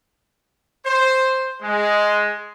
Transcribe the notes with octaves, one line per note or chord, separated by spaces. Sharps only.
C5
G#3